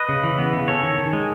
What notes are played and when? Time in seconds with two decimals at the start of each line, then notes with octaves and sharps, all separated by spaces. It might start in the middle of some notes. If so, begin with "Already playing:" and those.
Already playing: B4 D#5
0.09 C#3
0.24 E3
0.38 B3
0.53 C#3
0.68 C#4 A4 C#5
0.83 D#3
0.98 D#3
1.13 G#3